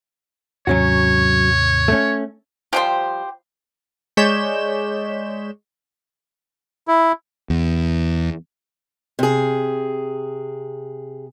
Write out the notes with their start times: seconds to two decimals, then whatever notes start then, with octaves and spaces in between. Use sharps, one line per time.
0.67 D#2 G#2 C3 F#3 C#4 F#4 C#5
1.88 A3 C#4
2.73 F3 G3 G4 C5 G5
4.17 G#3 C#5 D5 G6 B6 E7
6.88 E4
7.50 E2
9.19 C3 G#4